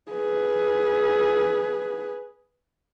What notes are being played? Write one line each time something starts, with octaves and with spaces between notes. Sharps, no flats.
G#4 B4